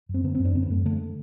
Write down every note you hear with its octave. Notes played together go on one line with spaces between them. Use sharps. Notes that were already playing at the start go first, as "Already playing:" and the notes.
F#2
C4
D3 B3
C4
F#2
D4
D3 C4
B3
F#2 A3
D3 A3